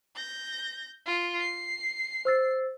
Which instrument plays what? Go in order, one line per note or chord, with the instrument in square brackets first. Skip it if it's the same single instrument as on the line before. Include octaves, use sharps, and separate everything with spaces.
[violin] G6 A#6
F4
C7
[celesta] C5 E6 A6